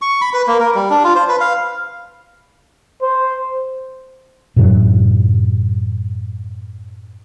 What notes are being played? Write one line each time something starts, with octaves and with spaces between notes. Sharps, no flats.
C#6
B5
B4
A#3
A#4
G3
D4
F4
C5
B4
F5
C5
F#2 A2 C3 F#3